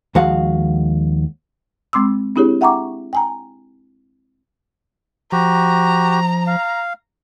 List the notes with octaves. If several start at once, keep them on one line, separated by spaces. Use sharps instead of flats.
D#2 F3 G#3 F#4 F5 F#5
G#3 C4 C6 D6 E6
C4 D4 E4 G4 G#4 C#5
E5 F#5 G5 A#5 C#6 D6
G5 G#5 A#5
F3 F#4 G4 A#5
F5